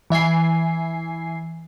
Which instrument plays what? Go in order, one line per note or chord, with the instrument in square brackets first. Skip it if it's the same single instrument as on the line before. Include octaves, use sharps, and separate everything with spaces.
[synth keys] E3 E5 G#5 C7